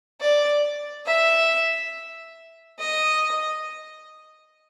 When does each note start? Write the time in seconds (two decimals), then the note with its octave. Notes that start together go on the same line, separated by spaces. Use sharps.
0.21 D5
1.07 E5
2.79 D#5